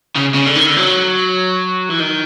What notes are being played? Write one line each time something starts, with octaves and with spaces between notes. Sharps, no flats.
C#3
C#3
D3
D#3
D3
F#3
E3
D#3